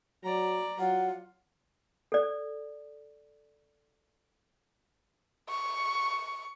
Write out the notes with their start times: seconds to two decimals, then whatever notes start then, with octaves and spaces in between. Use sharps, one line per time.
0.24 F#3 D5 A#5
0.80 F#3 F4 F#5
2.12 A4 D5
5.50 C#6